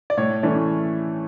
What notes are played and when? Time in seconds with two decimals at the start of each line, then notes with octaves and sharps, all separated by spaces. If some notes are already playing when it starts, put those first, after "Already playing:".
0.10 D5
0.17 A2 C#5
0.43 E3 A3 C#4 D5